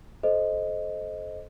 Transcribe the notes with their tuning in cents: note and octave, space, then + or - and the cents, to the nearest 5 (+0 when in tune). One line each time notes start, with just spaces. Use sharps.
A4 -30 C5 +0 D#5 +0